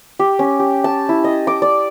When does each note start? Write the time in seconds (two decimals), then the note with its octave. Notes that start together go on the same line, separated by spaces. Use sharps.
0.19 G4
0.39 C#4
0.59 G4
0.84 A5
1.09 E4
1.24 D#5
1.47 D6
1.62 D5